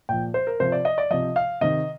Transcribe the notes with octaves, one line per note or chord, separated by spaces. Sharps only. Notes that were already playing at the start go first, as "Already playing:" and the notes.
A#2 F3 G5
C5
A#4
C3 F3 C5
D5
D#5
D5
C3 F3 D#5
F5
C3 D#3 D#5